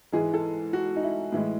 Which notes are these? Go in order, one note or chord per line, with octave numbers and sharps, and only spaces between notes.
G#2 E3 G#3 G#4
A4
F#4
D#4
E4
A2 E3 G#3 E4